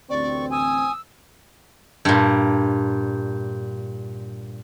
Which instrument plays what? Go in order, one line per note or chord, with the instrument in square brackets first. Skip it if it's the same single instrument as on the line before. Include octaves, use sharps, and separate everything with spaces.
[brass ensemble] A1 D2 C4 [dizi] D5 [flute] C#6
[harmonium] G#5 [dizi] D#6 [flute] E6
[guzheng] G2 A#2